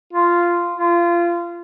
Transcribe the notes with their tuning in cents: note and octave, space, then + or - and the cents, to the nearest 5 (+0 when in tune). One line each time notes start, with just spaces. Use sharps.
F4 -10
F4 -25